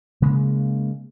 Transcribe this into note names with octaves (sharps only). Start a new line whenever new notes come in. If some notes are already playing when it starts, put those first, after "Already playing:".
C#3 G#3 A#3